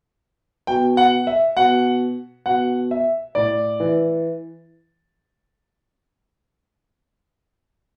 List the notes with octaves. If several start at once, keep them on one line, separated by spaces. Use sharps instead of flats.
B2 G5
F#5
E5
B2 F#5
B2 F#5
E5
A2 D5
E3